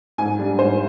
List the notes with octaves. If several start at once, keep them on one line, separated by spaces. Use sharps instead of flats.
G#2 G#5
G3 D4
G#2 C5